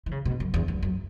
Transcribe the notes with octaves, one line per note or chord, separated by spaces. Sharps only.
E3
C#3
B2
F#2
E2
F#2
F#2